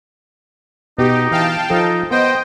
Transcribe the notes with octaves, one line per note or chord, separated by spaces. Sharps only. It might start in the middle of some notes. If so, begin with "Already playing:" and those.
B2 D#4 G4
E3 F5 G5 A5
F3 D#4 A4
B3 C5 D#5 G5